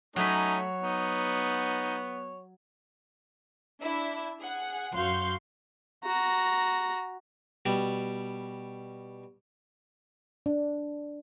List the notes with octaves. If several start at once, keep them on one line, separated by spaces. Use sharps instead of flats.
F#3 A3 C#4 D#4 C#5 B5
B3 D#4
D4 E4 E5
G#4 F#5
F#2 F#4 F5 C6 C#6 G6
F#4 A#5
B2 G3
D4